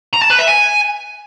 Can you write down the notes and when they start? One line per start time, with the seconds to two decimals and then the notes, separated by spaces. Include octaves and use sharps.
0.13 A#5
0.22 A5
0.30 B4
0.39 E5
0.47 G#5